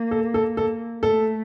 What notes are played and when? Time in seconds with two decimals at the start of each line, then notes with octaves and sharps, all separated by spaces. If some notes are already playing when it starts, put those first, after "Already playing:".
Already playing: A#3
0.11 A4
0.34 A4
0.57 A4
1.03 A3 A4